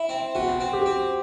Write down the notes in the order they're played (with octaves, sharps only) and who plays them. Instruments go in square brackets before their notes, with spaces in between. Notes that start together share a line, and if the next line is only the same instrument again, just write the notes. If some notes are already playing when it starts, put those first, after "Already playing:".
Already playing: [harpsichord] E4
C4
[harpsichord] B2 [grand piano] F#4
[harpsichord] C4
[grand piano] G4
[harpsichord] C4